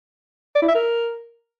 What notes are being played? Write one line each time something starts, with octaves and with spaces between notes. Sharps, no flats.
D5
E4
E5
A#4